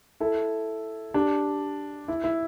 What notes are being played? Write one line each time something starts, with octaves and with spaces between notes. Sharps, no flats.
E4 A4
D4 G4
E4
E4